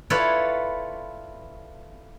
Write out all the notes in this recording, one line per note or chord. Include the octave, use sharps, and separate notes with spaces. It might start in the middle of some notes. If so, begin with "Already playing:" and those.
E4 F4 A4 B4 C#5 D5